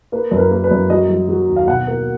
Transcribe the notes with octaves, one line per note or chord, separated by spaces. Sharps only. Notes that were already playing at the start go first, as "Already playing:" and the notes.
A#3 B4
F#2 B4
A#4
A#3
B4
F#2
F#3 D#5
F#3
F#3
D#2
F5
B2 F#5
A#3